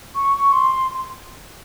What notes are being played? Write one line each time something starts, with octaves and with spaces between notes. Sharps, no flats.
C#6
C6